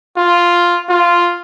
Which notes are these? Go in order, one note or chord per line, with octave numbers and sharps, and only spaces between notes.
F4
F4